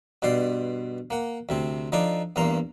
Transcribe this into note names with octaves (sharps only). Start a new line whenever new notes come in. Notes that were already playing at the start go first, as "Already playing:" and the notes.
G2 B2 C5 D5 C6
A#3 F#5
D2 C3 C4
F3 D4 D#4 A4 C6 D6
E2 G2 A#3 A#5 C6